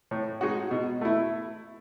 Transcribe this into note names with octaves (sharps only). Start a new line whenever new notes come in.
A2
G#3 D#4 F#4
B2
A3 E4